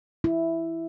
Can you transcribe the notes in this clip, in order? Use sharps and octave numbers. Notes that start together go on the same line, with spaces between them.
E4